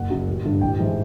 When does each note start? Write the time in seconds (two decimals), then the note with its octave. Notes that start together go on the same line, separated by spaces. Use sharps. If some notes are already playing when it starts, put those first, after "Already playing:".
Already playing: F#1 F#5
0.10 F#2 C#3 F#3
0.27 A1
0.45 G2 D3
0.61 A1 G5
0.79 G#2 E3 G#3